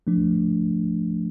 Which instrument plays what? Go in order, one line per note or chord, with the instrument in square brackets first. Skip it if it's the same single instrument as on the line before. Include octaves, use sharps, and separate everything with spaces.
[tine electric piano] F3 A3 D4